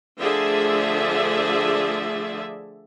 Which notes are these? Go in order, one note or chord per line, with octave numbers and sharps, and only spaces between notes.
D3 F3 A3 G#4 D5 E5